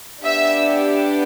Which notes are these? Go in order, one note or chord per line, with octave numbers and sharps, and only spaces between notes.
B3 D4 G4 E5